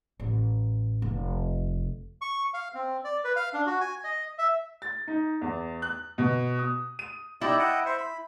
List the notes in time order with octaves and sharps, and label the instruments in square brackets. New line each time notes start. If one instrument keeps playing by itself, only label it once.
[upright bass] A1
F1
[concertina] C#6
F5
C4
D5
B4
F5
D4
F#4
G#5
D#5
E5
[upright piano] A6
D#4
E2
F#6
B2
D#6
D#7
[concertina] D#4 G4 D5 [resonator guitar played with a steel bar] E4
[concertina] D#5 F#5 G5
C5 E5
B5